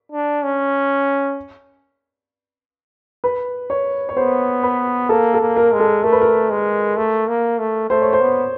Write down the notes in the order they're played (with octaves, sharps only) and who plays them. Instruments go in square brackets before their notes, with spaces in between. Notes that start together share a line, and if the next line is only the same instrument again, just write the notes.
[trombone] D4
C#4
[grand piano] B4
C#5
C#5
[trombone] B3 [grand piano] C5
[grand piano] B4
[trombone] A#3 [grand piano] A4
[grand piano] A4
[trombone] A#3
[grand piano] A#4
[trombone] G#3
[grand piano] A4
[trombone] A3 [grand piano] A#4
[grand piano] B4
A#4
[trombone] G#3
A3
A#3
A3
[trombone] A3 [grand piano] C5
[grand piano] C#5
C5
[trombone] B3